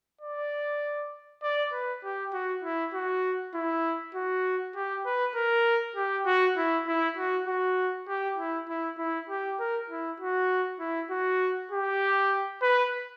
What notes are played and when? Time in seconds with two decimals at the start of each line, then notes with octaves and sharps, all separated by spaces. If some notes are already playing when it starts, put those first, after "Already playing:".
0.21 D5
1.43 D5
1.72 B4
2.04 G4
2.34 F#4
2.64 E4
2.94 F#4
3.55 E4
4.15 F#4
4.76 G4
5.06 B4
5.35 A#4
5.96 G4
6.26 F#4
6.57 E4
6.88 E4
7.17 F#4
7.47 F#4
8.08 G4
8.38 E4
8.69 E4
8.98 E4
9.30 G4
9.60 A#4
9.90 E4
10.20 F#4
10.80 E4
11.11 F#4
11.72 G4
12.62 B4